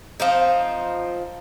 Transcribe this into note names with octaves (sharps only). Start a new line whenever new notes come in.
F3 C4 D#4